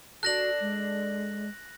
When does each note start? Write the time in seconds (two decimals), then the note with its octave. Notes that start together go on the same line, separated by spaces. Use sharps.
0.23 D4 F#4 A4 F#6 A#6 F#7
0.60 G#3